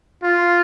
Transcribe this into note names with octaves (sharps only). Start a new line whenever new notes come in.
F4